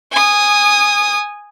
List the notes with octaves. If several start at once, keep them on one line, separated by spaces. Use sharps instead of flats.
G#5 D#6